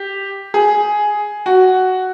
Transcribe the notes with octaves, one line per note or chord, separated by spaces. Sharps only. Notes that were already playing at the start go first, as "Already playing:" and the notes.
Already playing: G4
G#4
F#4